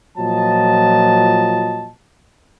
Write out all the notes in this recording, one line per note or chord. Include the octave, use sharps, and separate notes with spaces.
A#2 F3 F#3 D#5 A5